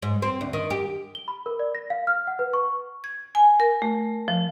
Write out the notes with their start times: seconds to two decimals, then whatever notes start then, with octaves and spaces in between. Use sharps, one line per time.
0.02 G#2
0.22 C4
0.41 D2
0.53 D#3
0.70 G4
1.15 G7
1.28 B5
1.46 A#4
1.59 D5
1.75 A#6
1.90 F5
2.07 F6
2.27 F#5
2.39 B4
2.53 C#6
3.04 G#6
3.35 G#5
3.60 A#4
3.82 A3
4.28 F3